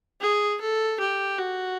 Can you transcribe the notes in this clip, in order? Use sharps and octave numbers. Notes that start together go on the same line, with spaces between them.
G#4
A4
G4
F#4